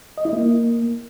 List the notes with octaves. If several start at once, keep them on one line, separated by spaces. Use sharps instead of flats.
D#5
E4
A#3